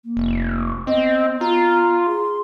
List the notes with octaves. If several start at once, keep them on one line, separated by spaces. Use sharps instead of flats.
A#3
F1
B3 C4 D#5
F4 A#5
G#4 C6